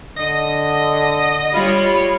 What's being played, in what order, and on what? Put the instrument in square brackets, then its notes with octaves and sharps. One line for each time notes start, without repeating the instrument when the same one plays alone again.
[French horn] D3 [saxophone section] D#5
[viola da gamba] G3 C#5 [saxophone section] F4 [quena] B5